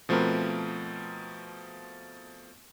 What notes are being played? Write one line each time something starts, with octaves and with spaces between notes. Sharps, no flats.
B2 F3 A3 C4 A#4 B4